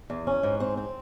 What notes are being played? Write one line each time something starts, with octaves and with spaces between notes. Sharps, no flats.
E2
C#4
G#2
C4
C4